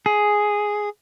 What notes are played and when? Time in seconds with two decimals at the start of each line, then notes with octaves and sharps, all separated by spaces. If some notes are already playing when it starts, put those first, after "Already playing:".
0.06 G#4